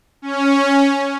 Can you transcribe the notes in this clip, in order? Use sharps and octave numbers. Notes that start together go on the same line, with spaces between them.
C#4